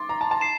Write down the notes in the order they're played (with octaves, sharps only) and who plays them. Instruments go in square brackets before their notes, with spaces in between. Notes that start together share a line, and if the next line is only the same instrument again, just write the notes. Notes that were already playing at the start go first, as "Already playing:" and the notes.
Already playing: [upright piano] C6 D6 [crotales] A6
[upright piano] A#5
A5
A5
[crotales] C7 E7